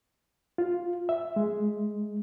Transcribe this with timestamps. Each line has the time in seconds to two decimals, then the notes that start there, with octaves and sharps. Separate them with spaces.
0.58 F4
1.09 E5
1.36 G#3